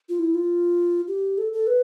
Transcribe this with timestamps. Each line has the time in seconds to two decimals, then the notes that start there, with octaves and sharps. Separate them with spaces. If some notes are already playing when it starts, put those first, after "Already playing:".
0.09 F4
0.19 E4
0.35 F4
1.08 G4
1.38 A4
1.53 A4
1.67 B4